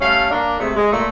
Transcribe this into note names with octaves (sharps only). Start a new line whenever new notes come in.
G3 A3 C#4 F5
A#3 D4
C3 G#3 A3
G#3
A#2 A3